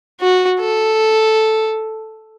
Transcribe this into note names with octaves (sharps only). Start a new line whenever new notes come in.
F#4
A4